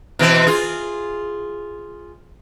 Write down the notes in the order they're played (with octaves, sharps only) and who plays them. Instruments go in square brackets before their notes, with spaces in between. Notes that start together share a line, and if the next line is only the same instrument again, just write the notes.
[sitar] B2 E3 C4
F4 G#4